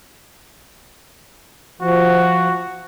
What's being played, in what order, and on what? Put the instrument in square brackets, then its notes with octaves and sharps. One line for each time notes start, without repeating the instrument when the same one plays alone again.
[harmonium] F3 [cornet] F#4